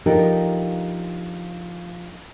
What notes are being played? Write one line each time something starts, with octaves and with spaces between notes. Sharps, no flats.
F3 D4 D#4 G4 A4 A#4